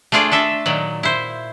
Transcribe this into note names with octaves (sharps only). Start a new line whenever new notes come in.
A3 D4 F4 G#4 D5
D4 A4 E5
A#2 D#3 F#3
E4 C5